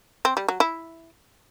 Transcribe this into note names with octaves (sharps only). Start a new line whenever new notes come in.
C4
G3
F#3
E4